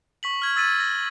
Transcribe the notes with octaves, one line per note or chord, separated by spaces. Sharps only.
C#6 B6 F#7
F6 G#6
E6 A6 B6 D#7
A#6